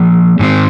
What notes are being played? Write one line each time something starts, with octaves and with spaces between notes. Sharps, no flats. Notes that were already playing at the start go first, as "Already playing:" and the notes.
Already playing: F3 A#3 G#4
G#2 D#3 C4